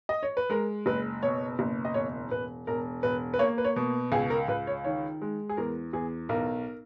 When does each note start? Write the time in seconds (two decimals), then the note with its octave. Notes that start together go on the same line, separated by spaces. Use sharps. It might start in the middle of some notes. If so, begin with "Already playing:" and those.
0.09 D#5
0.23 C#5
0.37 B4
0.50 G#3 A#4
0.86 F#1 B4
1.23 B2 C#5
1.59 F#1
1.85 D#5
1.94 E1 C#5
2.31 E1 B4
2.67 E1 A#4
3.03 E1 B4
3.34 B4
3.39 A#3 C#5
3.58 B4
3.65 C#5
3.76 B2
4.12 C#2 G#4
4.30 A#4
4.48 C#2 B4
4.67 C#5
4.84 D#3 C#5
5.22 G#3
5.49 G#4
5.57 E2 A#4
5.93 E2 G#4
6.29 B1 A#4